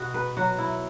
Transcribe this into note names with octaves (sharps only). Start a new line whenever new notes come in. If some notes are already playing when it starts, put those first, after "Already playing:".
Already playing: B2 F#4
B4
F#3 F#4
E4